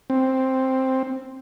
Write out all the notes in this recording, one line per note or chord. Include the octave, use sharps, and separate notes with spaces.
C4